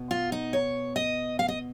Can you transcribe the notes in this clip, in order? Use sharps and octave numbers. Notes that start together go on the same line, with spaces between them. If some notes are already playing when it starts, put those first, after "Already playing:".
Already playing: B2 B3
F4
D#4
C#5
D#5
F5
D#5